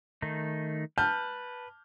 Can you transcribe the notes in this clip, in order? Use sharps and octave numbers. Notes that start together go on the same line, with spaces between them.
D#3 A3 D#4
B4 A5 F6 G6